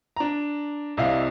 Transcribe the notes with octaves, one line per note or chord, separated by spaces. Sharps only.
D4 A#5
C2 C3 E4 D#5 F5